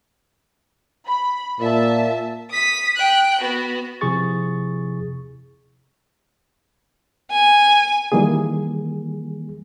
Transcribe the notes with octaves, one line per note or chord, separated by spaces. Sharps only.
B5
A#2 E5 A5
D#6 B6
G5 F#6
B3 F#4
C3 F3 E4 G#4 C#6 A6
G#5
D#3 E3 G3 A#3 G#4